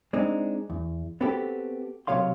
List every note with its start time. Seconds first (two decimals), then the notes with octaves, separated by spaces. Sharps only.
0.13 G#3 C4 D4 D#4
0.70 E2
1.21 B3 C4 F#4 G4 A4
2.07 B1 C3 F#3 C#5 F5 C6